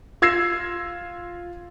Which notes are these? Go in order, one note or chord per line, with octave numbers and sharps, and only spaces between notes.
F4 E6 G#6 A#6 C7 E7